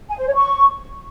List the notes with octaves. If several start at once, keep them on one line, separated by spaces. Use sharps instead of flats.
G#5
C5
C#5
C#6